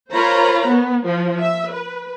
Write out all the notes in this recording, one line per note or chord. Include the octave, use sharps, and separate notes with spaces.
F4 A#4 C5 C#5 A#5 B5
B3
F3
E5
B4